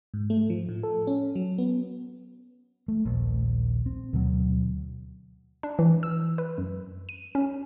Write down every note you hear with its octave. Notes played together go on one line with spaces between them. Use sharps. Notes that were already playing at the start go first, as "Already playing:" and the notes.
G#2
A3
F3
A2
A4
C#4
F#3
B3
A3
D#1 A#1
C4
D2 B2 F#3
D4
E3
E6
B4
F#2
D#7
C#4